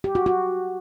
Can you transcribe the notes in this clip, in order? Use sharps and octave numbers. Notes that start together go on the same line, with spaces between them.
G4
F#4
F#4